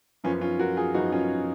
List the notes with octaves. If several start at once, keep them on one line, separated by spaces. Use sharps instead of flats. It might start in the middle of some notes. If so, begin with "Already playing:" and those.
F#2 F3 B3 C#4 F4
C#4 F4
F#4 A#4
F4 G#4
F#2 F3 B3 D#4 F#4
C#4 F4